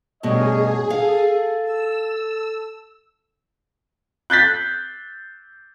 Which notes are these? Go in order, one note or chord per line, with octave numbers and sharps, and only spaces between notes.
G2 B2 A3 C#4 G#4 C#5 D#5
A4 F5
E6
F#6 G6 A6 B6